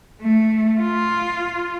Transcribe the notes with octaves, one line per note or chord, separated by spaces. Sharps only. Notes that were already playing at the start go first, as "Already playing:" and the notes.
A3
F4